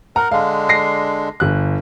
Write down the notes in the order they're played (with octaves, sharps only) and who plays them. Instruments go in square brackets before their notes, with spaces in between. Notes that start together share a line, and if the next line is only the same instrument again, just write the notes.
[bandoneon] A#4 F#5 [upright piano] A#5
[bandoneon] D3 G#3 D4 [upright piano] F5
[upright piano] A#6 C7
G1 F#6